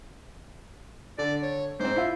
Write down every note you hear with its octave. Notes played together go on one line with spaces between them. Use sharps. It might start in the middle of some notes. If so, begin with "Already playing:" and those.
D3 D5
C#5
G#2 C4 C5
E4 F4